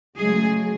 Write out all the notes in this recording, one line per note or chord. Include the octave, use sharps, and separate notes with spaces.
C#3 F#3 G#3 A3 G#4